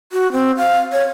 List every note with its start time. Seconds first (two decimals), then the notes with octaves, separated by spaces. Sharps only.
0.13 F#4
0.32 C4
0.57 F5
0.92 C#5